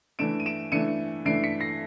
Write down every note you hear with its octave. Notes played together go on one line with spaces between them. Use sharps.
E3 A3 D4 D7 E7
D#7
D7 E7
E3 A3 D4 C#7 D#7
E3 A3 D4 C7 D7
B6 C#7
A#6 C7